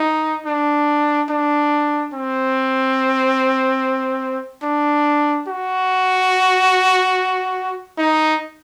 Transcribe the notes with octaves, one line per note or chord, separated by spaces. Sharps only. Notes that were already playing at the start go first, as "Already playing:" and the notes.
Already playing: D#4
D4
D4
C4
D4
F#4
D#4